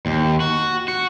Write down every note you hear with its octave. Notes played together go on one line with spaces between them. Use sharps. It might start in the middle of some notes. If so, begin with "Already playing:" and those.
D#2
F#4
F#4